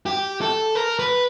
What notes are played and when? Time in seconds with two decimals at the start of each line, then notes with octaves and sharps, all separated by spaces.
0.06 G4
0.41 A4
0.75 A#4
0.99 B4